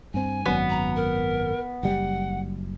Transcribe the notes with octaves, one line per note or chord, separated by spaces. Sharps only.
G2 C4 G#5
G#1 F#2 F#3 B3
A#5
A#4
F#1 G3 F#5